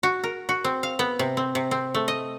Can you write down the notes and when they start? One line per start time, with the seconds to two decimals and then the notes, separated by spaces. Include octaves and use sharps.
0.03 F#4
0.24 A#4
0.49 F#4
0.64 C4
0.83 F5
0.99 B3
1.19 C3
1.37 C4
1.55 C3
1.71 C4
1.94 A3
2.08 D#5